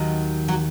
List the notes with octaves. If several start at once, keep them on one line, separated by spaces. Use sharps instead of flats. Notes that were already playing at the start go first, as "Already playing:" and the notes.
Already playing: D#2 D#3 F#3
F#3 F#4